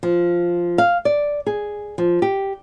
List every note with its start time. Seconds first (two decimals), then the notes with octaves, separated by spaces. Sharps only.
0.03 F3
0.78 F5
1.05 D5
1.47 G#4
1.98 F3
2.22 G4